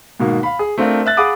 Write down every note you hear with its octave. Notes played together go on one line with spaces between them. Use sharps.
G#2 B2 D#3 A#3
F5 B5
G#4
A3 C4 D4 F4 A#4
E5 F#6 A6
G#4 F5 F#5 B5 D6 D#6